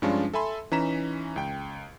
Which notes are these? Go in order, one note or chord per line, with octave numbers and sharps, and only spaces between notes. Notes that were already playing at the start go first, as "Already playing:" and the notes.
G2 F3 G#3 C#4 D4 F4
A4 E5 G#5 B5 C6
E3 C#4 D#4 A#5 B6 E7
C#2 G5